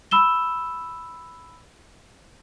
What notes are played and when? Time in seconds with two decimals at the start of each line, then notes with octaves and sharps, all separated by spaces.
0.11 B5 E6 E7 G7